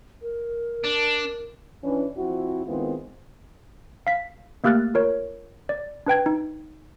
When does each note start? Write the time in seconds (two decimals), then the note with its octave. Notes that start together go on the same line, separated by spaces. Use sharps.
0.22 A#4
0.85 D4
1.84 E3 C#4 D4
2.17 F3 C4 E4 F#4
2.66 D#3 G#3 B3 C4 E4 F4
4.07 F5 B6
4.64 A3 A#3 G4 F6 F#6 A6
4.94 F4 A#4 C#5
5.69 D5
6.06 D4 B4 G5 G#6
6.26 D#4